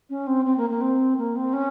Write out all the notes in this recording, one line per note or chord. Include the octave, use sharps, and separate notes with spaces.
C#4
C4
C4
A#3
A#3
C4
A#3
C4
C#4